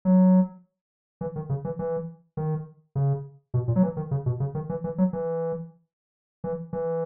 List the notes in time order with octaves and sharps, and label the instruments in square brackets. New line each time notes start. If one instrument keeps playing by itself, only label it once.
[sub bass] F#3
E3
D#3
C#3
E3
E3
D#3
C#3
B2
A#2
F#3
E3
D#3
C#3
B2
C#3
D#3
E3
E3
F#3
E3
E3
E3